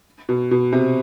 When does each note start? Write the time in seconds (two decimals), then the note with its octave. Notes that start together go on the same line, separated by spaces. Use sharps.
0.29 B2
0.51 B2
0.73 C3